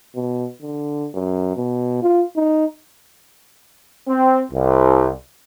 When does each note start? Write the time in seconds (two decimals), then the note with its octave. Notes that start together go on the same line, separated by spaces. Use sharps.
0.16 B2
0.61 D3
1.14 F#2
1.56 B2
2.02 F4
2.36 D#4
4.07 C4
4.51 C2